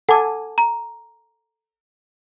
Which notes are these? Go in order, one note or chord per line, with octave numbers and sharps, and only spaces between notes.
A4 F#5 G#5 D6
A#5